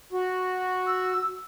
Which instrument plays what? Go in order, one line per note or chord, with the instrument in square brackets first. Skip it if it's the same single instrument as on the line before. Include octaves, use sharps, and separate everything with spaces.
[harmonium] F#4
[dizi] E6